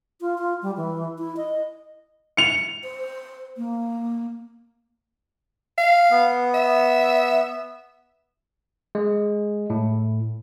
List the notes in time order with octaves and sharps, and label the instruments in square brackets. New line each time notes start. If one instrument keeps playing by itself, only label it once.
[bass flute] F4
F4
G3
E3
E4
D#5
[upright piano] C#7 F7
[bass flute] C5
A#3
[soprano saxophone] F5
[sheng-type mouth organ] B3
[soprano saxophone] E5
[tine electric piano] G#3
A2